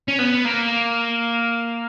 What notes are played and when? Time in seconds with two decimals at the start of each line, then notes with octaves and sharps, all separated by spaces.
0.08 C#4
0.19 B3
0.45 A#3